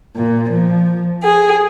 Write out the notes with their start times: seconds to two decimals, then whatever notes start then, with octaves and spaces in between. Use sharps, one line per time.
0.16 A#2
0.49 F3
1.24 G#4